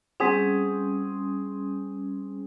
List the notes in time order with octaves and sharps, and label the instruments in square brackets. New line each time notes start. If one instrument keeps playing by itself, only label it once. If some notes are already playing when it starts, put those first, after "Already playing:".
[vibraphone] G3 C#4 [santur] C4 G#4